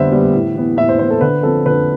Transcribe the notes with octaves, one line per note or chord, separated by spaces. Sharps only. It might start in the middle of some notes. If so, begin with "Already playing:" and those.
Already playing: D3 G3 B3 B4 C5 E5
G3 B3
A2
E3 B3
A2 E5
C5
E3 B3 C5
A4
D3 B4
F3 C4 A4
D3 B4